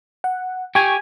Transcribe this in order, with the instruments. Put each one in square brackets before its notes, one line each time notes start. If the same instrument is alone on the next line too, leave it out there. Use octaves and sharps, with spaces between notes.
[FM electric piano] F#5
[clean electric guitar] G4 G#5 [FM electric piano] G5 C#6